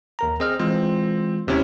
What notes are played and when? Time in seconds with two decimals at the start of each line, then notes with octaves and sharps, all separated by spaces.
0.19 D#2 A#4 A#5
0.40 C4 G#4 D#5 F6
0.59 E3 G#3 C4 F4
1.48 D#2 C3 C#4 E4 C#5